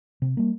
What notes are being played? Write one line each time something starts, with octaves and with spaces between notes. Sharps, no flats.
C3
G3 A#3